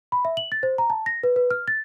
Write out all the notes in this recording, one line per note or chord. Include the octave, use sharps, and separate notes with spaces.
B5
E5
F#7
A6
C5
A#5
A5
A#6
B4
B4
F6
A6